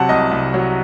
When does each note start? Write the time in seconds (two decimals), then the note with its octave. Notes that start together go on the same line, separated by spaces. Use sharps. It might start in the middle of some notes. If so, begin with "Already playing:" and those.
Already playing: C3 F#3 F#5 A5
0.09 C2 D#5
0.31 C2
0.54 F#3